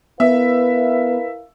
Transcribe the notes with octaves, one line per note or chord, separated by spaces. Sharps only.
B3 E4 A#4 B4 E5 F5